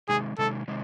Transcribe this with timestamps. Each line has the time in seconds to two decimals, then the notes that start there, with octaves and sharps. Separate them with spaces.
0.08 C3 D#3 G#3 G#4
0.38 C3 D#3 G#3 A4
0.68 C3 D#3 G#3